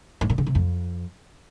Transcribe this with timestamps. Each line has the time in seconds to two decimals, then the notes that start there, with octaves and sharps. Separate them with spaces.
0.21 G#2
0.30 A#2
0.38 C#3
0.46 C3
0.55 F2